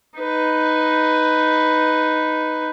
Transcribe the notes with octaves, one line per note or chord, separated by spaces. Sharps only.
D#4 B4